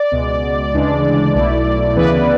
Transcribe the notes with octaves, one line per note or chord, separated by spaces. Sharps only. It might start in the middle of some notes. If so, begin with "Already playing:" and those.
Already playing: D5
C#2 B2 G#3 B3
D2 C#3 E3 G#3 D4
B1 B2 A3 E4
D2 C#3 E3 B3 E4 B4